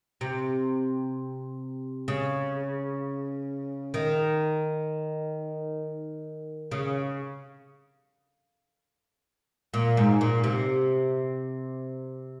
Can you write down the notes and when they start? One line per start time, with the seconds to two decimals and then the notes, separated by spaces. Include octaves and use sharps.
0.21 C3
2.08 C#3
3.94 D#3
6.71 C#3
9.74 A#2
9.97 G#2
10.21 A#2
10.44 C3